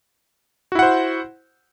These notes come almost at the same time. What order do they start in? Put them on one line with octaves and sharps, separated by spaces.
F#4 E4 F#5 C5